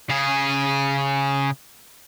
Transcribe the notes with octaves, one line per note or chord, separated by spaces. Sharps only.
C#3 G#4